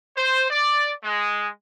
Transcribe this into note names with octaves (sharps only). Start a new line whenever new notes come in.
C5
D5
G#3